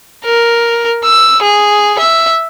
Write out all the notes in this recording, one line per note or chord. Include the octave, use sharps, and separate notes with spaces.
A#4
E6
G#4
E5